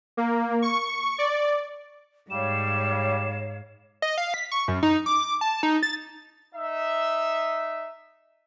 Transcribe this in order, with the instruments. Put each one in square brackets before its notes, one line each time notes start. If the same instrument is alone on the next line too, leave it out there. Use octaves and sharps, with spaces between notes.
[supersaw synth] A#3
C#6
D5
[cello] G#2 [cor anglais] G3 [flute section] C#5 F5 [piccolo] E7
[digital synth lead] D#5
F5
B6
C#6
F#2
D#4
D6
A5
D#4
A6
[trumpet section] D#4 E5